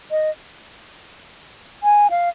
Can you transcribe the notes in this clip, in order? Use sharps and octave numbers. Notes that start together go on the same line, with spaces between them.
D#5
G#5
F5